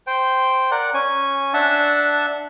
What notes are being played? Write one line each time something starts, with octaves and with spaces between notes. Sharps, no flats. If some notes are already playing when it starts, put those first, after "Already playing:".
C5 G5
A#4 D5 F#5
C#4 G#5
D4 E5 F#5 A5